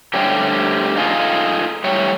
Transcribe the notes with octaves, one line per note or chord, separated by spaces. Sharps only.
D3 G3 A3 C4 C#4 G4
D#4 F4 G#4 A4
G3 A3 C#5